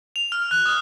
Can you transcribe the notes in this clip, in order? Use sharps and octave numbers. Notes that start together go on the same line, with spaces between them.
F7
F6
F#6
D#6